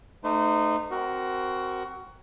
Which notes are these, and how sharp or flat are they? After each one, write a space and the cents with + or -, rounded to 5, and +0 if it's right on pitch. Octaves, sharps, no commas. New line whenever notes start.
A3 +5 D#4 -25 C5 -35
C4 +0 F#4 +15 A#4 +0